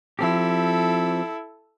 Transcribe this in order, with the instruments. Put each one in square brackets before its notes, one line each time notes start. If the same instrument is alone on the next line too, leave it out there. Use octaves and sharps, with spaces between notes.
[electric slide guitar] F3 C4 G4 [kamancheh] E4 A4